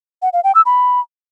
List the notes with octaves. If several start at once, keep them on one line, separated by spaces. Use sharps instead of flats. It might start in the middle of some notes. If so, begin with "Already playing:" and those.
F#5
F5
G5
E6
B5